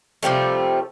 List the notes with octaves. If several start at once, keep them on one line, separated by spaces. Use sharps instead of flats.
C3 F3 G3 A3